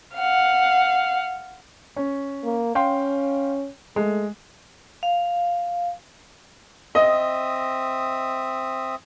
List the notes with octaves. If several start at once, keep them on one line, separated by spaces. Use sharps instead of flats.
F5 F#5
C#4
A#3
C#4 F5 G5 C6
G#3 A3
F5
C4 D#5 E5 D#6